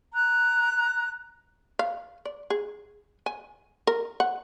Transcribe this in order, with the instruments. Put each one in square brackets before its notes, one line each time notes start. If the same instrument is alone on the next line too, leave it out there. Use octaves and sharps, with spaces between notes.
[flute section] A#5 F#6
[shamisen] F5
D5
G#4
G#5
A#4
F#5